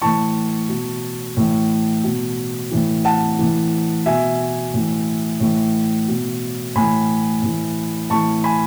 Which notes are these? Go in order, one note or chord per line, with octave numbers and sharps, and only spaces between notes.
A2 E3 A5 C#6
B2
A2 E3
B2
A2 E3
F#5 A5
A2 E3
B2 E5 G#5
A2 E3
A2 E3
B2
A2 E3 G#5 B5
A2 E3
A2 E3 A5 C#6
G#5 B5